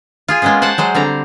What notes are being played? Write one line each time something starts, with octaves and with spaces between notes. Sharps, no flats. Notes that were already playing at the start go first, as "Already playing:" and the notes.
F4 G#4 G#5
G#3 A#3 B3 C#4 G#4
C5 F#5 G5 A5
F#3 G#3 C5
D3 G3 C4 A#5